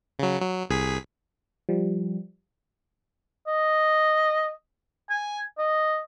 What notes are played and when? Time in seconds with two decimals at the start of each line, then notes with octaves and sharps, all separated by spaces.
0.19 C#3 F#3
0.42 F#3
0.70 C2 G#4 B6
1.69 F3 G3
3.47 D#5
5.10 G#5
5.59 D#5